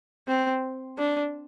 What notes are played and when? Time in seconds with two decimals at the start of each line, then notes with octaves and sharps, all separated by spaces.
0.28 C4
0.98 D4